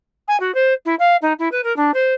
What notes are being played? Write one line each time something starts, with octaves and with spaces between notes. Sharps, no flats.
G#5
F#4
C5
E4
F5
D#4
E4
B4
A#4
D4
C5